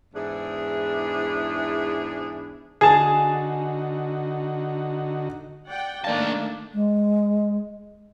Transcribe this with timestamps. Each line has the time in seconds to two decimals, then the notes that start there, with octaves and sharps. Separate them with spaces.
0.15 E2 G#2 D4 E4 G#4
2.81 D3 D#4 F#4 G#4 A5
5.69 D5 F#5 G5
6.04 D#3 A3 A#3 D4 D5 F5 A5
6.74 G#3